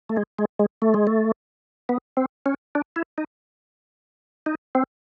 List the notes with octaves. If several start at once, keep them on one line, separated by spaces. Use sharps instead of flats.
A3
G#3
G#3
G#3
A3
G#3
A3
B3
C4
C#4
D4
E4
D#4
D#4
C4